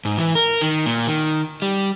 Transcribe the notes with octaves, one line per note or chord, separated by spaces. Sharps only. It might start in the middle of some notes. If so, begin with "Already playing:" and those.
G#2
E3
A#4
D#3
A#2
D#3
G3